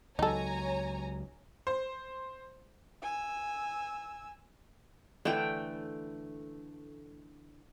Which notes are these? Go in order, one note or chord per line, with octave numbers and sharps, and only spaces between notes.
C#2 F#3 D#4 A4 C#5 G#5 A#5
C5
G#5 E6
D3 E3 A3 B4 G5